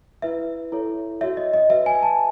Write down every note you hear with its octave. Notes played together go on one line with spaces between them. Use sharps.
E4 B4 E5
E4 A4 C#5
F#4 C#5 E5
D#5
D#5
F#4 B4 E5
G#5
A5